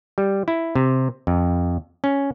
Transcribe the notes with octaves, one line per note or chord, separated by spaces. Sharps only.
G3
E4
C3
F2
C#4